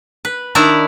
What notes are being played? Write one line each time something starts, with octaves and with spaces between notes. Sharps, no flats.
B4
D#3 D4 E4 D5 E5 A#5